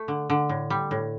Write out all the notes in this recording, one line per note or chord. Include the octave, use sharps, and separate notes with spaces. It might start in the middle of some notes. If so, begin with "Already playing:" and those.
Already playing: A3
D3
D3
A2
G3
A2